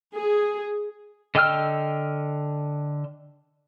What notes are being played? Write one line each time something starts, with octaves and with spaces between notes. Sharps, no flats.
G#4
D3 D#5 G5 E6 F6